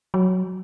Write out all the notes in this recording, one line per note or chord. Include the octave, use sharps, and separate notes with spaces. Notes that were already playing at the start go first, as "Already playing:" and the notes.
F#3